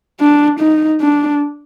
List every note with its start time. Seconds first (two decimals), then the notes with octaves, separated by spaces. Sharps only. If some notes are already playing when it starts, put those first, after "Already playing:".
0.20 D4
0.60 D#4
1.01 D4